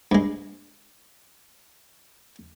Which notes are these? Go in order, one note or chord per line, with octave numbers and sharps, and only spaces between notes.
G2 G#3